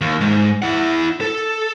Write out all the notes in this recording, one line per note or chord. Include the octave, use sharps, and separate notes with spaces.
D#2
G#2
E4 F#5
A4